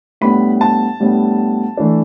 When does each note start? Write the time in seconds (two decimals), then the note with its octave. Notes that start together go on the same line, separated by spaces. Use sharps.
0.21 A2 G3 B3 D4 B5
0.61 A5
1.00 A2 G3 B3 D4
1.77 E3 A3 D4